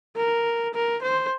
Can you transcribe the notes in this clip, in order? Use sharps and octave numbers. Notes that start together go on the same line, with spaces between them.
A#4
A#4
C5